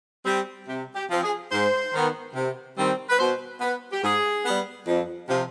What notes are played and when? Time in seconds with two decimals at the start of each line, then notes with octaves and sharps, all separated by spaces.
0.26 G3 C4
0.68 C3 G4
0.96 G4
1.10 F3 C4
1.24 G#4
1.52 G#2 C5
1.94 D#3 B3
2.35 C3
2.78 D#3 G3 C4
3.10 B4
3.19 B2 C5
3.61 B3 B4
3.93 G4
4.03 G#2 G#4
4.46 G3 B3
4.87 F2
5.29 C3 F3